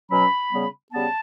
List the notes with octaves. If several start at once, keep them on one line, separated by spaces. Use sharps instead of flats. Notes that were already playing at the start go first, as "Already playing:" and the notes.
B2 F#3 C#4 B5
C#3 G3 B3
C#3 G3 B3 A5